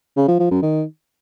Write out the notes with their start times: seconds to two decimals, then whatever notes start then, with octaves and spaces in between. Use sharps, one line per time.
0.17 C#3
0.28 F3
0.40 F3
0.51 F#2
0.62 D#3